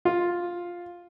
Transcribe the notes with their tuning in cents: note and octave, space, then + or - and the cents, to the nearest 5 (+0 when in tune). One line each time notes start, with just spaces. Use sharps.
F4 +5